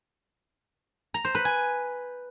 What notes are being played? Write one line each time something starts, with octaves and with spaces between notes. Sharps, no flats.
A#5
C5
B4
G#5